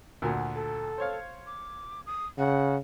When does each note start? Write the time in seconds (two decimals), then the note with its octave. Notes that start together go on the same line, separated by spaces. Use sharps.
0.22 D2 A#2 F#4
0.55 A4
0.98 C5 C#5 F5
1.47 D6
2.06 D#6
2.38 C#3 F#5